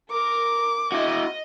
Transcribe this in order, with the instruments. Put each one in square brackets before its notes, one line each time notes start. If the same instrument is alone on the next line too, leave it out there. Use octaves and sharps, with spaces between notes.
[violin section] A#4 [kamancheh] D6
[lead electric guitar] E4 F#4 [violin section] D#5